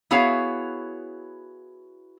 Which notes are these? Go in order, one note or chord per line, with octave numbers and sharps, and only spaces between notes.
B3 E4 F#4 G#4 C#5 F5